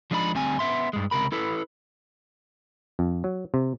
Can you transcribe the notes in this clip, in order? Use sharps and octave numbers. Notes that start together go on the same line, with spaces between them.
F3 G#3 D4 D#4 A4 B5
D2 G3 C4 G#5
B3 E5 C6
G2 G#3
C#2 C3 A#4 B5
E4 A4 B4
F2
F#3
C3